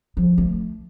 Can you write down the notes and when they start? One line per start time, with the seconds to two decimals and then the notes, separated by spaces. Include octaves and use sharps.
0.17 F3
0.38 A3